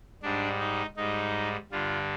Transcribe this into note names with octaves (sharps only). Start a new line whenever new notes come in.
G#2 G3 D4
D#4
G#2 G3 D#4
G2 D3 G3 F4